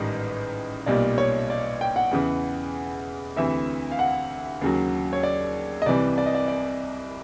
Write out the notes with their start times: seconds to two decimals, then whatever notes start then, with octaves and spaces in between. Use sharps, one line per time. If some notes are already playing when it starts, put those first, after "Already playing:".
Already playing: A1 G#2 D#3 G3
0.86 B1 A#2 G3 D5
1.18 C#5
1.50 D5
1.81 G5
1.96 F#5
2.11 E2 C#3 E3
3.36 D2 C3 E3 E5
3.91 F5
3.99 F#5
4.61 D#2 C#3 F#3
5.13 C#5
5.23 D5
5.82 D#5
5.86 C2 C3 E3 G3 D5
6.18 D5
6.26 D#5
6.35 D5
6.48 D5